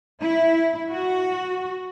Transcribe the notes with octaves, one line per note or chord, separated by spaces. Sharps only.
E4
F#4